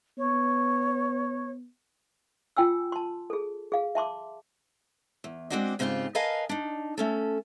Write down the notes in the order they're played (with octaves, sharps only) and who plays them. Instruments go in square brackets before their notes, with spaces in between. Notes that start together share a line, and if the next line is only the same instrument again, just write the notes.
[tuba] B3 [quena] C#5
[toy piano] F4 G5 G#5 E6
A5 C6
G#4 A4
G#4 F5
E5 A5 C6 D6
[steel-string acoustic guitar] E2
G#3 C4 D4 F#4 D5 D#5
G#2 C#3 C4 D#4 F4 G4
A#4 B4 D#5 F5 G#5 A5
D4 D#4
A3 C#4 A4